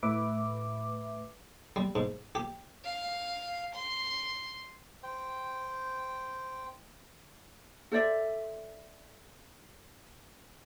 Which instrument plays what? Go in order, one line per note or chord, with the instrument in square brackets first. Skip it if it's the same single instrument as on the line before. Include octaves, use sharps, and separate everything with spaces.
[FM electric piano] A2 B4 E5 D6
[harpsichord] G3
G#2
G4
[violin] F5
C6
[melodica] C5 G5
[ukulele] A4 C5 D5 E5